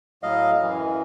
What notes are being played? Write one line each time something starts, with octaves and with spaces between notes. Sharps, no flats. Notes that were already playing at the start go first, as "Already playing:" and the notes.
A2 F#3 D#5 F5
F#2 E3